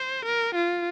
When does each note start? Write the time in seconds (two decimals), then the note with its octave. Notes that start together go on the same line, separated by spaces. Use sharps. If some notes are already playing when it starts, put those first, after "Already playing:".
Already playing: C5
0.25 A#4
0.55 F4